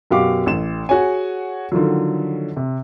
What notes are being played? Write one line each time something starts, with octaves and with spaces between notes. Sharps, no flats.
F#2 B2 F#4 G4 F5 D6
A1 E7
F#4 G#4 C#5 G#5
D3 D#3 F3 F#3
C3